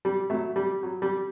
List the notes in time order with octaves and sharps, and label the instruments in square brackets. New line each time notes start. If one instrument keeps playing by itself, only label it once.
[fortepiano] G3
F#3 A3
G3
F#3
G3